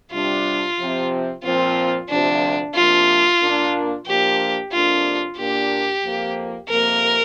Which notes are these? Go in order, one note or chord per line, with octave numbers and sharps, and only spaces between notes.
C3 G3 D4 F4
C3 F3 C4
A#2 F3 C4 F4
D2 C3 F3 D4
C3 F3 A#3 D4 F4
A#2 A#3 D4
A#2 F3 A#3 D4 G4
F2 C3 A#3 D4 F4
A#2 A#3 D4 G4
F2 F3 A#3
F2 C3 F3 A#3 A#4